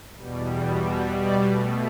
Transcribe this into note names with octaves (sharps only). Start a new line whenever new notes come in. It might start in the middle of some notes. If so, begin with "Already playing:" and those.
E2 B2 G3
B2 G3 E5
D5
B2 A3